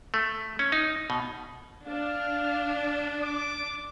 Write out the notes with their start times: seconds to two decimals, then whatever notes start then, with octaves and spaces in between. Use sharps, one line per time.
0.14 A3
0.59 C#4
0.72 D#4
1.10 B2
1.86 D4 F5
3.23 D6